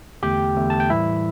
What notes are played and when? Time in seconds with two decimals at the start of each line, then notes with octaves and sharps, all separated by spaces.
0.23 E2 D3 A3 G4 G5
0.56 E2 D3 A3
0.70 A5
0.80 G5
0.90 A2 E3 G3 E4 E5